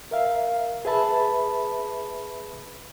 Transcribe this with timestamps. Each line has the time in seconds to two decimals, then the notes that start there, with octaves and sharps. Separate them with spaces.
0.11 A#4 E5 F5
0.85 G#4 B4 E5 A5 B5